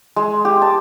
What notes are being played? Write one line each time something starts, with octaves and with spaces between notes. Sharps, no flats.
G#3
G4
A5